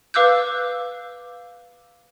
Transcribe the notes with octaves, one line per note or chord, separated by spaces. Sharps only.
B4 F5 D6 E6 F#6 G6